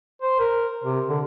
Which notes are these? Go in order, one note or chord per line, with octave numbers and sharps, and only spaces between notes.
C5
A#4
C3
D3